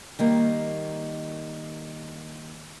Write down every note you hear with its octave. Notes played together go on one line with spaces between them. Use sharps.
D#3 G3 A#3